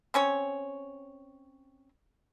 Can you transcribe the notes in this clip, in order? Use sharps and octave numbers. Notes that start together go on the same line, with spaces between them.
C4 C#4 C#5